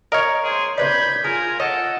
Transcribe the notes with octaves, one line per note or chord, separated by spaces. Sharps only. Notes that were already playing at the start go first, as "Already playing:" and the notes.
A#4 C#5 D#5 F5
G#4 C5 C6
C3 B4 D5 B5 G6 G#6
F4 G#4 A#4 G#5
A4 C#5 D#5 F#5